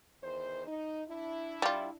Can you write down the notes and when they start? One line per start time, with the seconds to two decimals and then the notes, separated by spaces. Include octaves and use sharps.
0.23 E2 D#3 C5
0.66 D#4
1.08 D4 E4
1.62 G3 F4